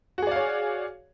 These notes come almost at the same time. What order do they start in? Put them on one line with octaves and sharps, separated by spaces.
F#4 G#4 D5 F5 C#5